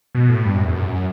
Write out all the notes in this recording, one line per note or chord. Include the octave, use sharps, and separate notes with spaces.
B2
A2
G2
F#2
E2
F#2